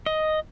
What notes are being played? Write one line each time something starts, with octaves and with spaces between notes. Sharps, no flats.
D#5